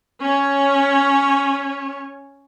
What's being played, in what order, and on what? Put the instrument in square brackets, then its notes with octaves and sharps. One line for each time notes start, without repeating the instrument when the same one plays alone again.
[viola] C#4 C#5